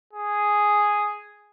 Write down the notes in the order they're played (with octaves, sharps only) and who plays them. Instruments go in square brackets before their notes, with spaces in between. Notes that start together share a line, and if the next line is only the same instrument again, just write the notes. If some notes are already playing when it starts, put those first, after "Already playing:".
[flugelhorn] G#4